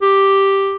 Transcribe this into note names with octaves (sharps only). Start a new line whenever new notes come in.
G4